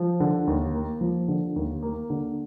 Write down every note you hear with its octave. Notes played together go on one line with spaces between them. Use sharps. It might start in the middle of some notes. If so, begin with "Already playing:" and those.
Already playing: F3
D3
D#2
A#3
F3
D3
D#2
A#3
D3